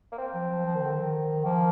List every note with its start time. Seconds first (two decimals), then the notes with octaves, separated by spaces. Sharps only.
0.12 A#3
0.18 C4
0.34 F3
0.50 F3
0.66 F3
0.75 D#3
0.83 D3
0.92 D#3
1.45 F3 A#3